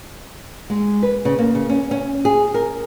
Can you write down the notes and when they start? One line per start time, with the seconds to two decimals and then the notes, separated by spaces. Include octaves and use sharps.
0.70 G#3
1.03 B4
1.25 C#3
1.38 A#3
1.55 C#3
1.69 C#4
1.91 C#4
2.25 G#4
2.54 A#4